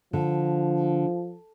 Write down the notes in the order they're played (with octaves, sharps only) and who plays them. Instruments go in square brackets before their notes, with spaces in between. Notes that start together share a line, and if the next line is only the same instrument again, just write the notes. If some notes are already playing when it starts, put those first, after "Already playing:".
[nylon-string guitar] D3 [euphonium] F3